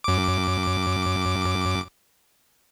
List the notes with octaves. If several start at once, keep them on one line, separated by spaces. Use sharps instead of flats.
F#2 D6